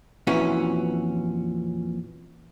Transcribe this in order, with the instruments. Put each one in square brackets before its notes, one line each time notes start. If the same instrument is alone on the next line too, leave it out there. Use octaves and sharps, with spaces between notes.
[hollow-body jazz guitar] F2 A#2 E3 C#4 F#4